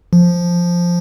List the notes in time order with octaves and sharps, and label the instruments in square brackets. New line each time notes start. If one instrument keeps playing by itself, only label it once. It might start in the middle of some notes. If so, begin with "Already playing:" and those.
[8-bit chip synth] F3